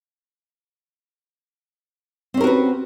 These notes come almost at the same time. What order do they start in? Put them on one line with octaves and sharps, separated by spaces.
C4 C#4 A#4 F#4 B4